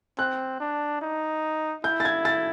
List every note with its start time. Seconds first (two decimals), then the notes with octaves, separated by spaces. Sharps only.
0.18 C4 F#6
0.60 D4
1.02 D#4
1.84 E4 G6
2.00 A6
2.05 G#6
2.25 A6